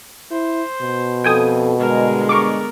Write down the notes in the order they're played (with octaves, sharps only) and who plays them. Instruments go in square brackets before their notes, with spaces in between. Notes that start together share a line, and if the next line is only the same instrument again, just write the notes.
[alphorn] E4 [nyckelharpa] C5
[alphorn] B2
[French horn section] F2 A4 [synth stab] G5 G#5 D#6
[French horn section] G2 D3 G#3 [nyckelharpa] G#4 A#4
[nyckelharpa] B3 A#4 [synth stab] C#6 D6